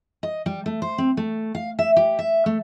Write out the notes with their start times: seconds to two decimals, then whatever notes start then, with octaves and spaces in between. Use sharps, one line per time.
0.23 D#5
0.46 G3
0.66 A3
0.82 C5
0.98 C4
1.17 A3
1.55 F5
1.79 E5
1.96 G4
2.19 E5
2.46 A3